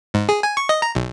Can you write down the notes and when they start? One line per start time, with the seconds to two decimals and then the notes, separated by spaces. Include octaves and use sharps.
0.14 G#2
0.29 G#4
0.43 G#5
0.57 C#6
0.69 D#5
0.82 A#5
0.95 B1